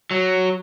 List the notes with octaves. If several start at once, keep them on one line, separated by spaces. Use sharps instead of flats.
F#3